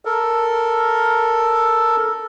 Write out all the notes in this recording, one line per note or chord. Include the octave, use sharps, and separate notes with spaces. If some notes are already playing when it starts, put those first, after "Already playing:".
A4 A#4